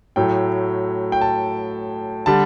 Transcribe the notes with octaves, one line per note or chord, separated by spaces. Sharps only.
A2 F#3 A3 G5
G5
A5
D3 G3 A5